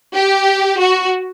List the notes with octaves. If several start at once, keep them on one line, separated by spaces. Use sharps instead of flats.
G4
F#4